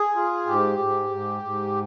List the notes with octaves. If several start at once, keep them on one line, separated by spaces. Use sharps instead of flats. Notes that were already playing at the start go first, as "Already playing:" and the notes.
Already playing: G#4
F4
G#2 G4
G#2
G#2
G#2